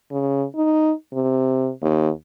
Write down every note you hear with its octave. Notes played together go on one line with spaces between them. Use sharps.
C#3
D#4
C3
D#2